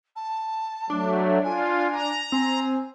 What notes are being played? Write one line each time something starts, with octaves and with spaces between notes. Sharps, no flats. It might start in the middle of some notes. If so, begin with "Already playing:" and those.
A5
F#3 A3 D4
F4 G#5
A#5
C4 G#5